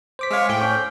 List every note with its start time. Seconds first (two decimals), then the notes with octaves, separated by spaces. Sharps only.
0.19 C5 D6 B6
0.31 G#3 C#5 E5 F5
0.49 A2 G5
0.61 C#4